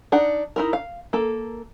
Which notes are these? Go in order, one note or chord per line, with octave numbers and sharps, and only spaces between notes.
D4 D#4 F#5
D#4 E4 A#4
F5
A#3 A4